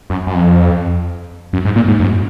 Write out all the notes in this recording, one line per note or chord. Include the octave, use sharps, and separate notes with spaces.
F#2
F#2
F2
F#2
G#2
A#2
G#2
F#2